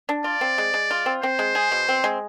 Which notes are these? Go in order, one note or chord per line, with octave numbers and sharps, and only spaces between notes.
D4
F4 D5
C4
G#3
G#3
F4
C4
C4 C5
G#3
G#4
B2
C4
G#3